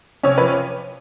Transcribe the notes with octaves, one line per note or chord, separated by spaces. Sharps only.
C3 C#4 C#5
F3 B4